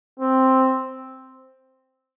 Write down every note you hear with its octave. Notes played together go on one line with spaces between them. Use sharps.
C4